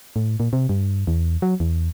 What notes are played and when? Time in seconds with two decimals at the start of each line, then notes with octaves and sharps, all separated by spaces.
0.16 A2
0.40 A#2
0.53 C3
0.69 G2
1.07 E2
1.42 F#3
1.60 E2